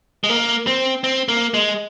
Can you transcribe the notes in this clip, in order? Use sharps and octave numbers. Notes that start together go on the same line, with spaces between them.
G#3
A#3
C4
C4
A#3
G#3